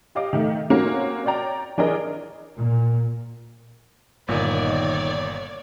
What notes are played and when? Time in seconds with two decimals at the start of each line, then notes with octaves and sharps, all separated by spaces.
0.15 G4 C#5 D#5 F5 D6
0.33 D#3 A3
0.70 A#3 C4 C#4 F#4
1.26 C#5 D5 G5 A#5
1.78 E3 D4 G#4 A#4 C#5 D#5
2.57 A#2
4.28 G1 A#2 D#3 C#5 D5